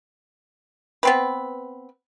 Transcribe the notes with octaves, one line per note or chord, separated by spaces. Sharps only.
B3 C4 B4